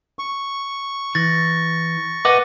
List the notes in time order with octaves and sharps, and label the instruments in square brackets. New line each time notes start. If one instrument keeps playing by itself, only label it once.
[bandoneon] C#6
[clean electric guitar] E3 [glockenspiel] A6 A#6
[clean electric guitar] B4 D#5 F#5 [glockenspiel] D6